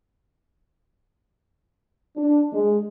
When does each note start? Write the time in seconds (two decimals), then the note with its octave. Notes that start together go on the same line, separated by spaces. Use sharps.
2.17 D4
2.53 G#3